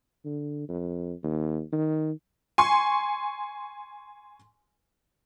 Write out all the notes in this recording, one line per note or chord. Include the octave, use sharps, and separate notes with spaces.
D3
F2
D#2
D#3
G#5 C6 C#6